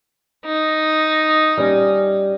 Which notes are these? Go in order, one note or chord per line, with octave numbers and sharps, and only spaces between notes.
D#4
G3 C#4